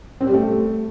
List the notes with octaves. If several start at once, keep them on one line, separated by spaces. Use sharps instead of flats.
C4
G3
A3